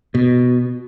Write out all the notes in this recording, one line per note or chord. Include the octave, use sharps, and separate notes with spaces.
B2